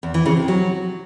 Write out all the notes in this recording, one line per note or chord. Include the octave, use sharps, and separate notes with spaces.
E2
E3
C#3
C3
F#3